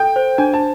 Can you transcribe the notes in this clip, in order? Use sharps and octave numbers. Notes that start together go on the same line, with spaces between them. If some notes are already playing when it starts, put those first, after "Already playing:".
Already playing: A4 G5
C5
D4 G#5
A5